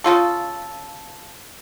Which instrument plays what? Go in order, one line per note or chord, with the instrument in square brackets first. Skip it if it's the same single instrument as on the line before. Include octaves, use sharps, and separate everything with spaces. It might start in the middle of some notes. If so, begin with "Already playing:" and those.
[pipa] C#3 G3 F4 A4